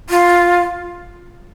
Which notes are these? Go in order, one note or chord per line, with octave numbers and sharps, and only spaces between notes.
F4